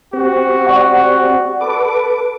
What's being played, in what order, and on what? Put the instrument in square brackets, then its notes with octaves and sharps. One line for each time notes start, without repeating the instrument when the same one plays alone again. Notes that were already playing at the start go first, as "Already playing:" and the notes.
[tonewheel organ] C4 G4 [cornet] F#4
[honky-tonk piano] D5 F#5 C#6
[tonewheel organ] A4 B4 D6